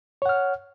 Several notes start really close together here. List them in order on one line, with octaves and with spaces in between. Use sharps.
C#5 F#5 F6